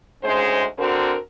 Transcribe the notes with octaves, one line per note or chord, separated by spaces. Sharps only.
D2 G#2 G#3 C#4 C5
D3 C4 F#4 A#4